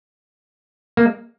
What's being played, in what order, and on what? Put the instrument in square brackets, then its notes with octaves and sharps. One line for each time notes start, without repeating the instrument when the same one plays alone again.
[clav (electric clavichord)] A#3